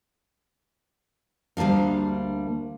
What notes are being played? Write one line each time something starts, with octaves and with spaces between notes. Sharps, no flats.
D2 G3 A#3 D4 F5